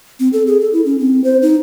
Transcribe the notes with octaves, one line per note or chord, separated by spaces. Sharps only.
C4
A4
G#4
A4
E4
C#4
C4
C5
D#4